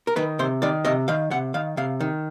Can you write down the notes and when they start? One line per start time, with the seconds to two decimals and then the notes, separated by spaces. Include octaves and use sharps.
0.07 A#4
0.16 D#3 B4
0.39 C3 C5
0.62 D#3 D5
0.85 C3 D#5
1.08 D#3 F5
1.31 C3 F#5
1.54 D#3 F5
1.77 C3 F5
2.00 D#3